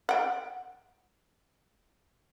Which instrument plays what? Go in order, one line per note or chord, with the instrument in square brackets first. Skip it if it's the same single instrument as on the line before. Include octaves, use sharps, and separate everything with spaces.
[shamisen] F#5 G5